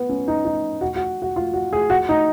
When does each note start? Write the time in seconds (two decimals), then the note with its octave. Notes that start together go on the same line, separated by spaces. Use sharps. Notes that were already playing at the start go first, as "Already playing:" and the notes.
Already playing: B3
0.09 C#4
0.28 D#4
0.45 D#4
0.81 F#4
0.96 F#4
1.22 F#4
1.36 F4
1.53 F#4
1.73 G#4
1.90 F#4
2.09 D#4